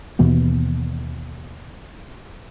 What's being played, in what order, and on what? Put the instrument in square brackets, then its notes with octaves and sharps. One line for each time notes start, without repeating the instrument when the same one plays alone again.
[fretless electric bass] D#2 B2 E3 B3